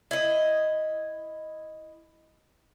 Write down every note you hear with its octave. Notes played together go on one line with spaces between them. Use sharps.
E4 D#5